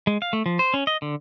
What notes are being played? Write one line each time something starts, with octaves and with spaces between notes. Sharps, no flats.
G#3
F5
A3
F3
C5
C#4
D#5
D3